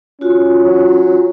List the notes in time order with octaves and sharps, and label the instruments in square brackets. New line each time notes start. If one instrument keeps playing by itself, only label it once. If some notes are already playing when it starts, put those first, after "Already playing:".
[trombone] C#4 [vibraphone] F4 F#4
[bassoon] F#3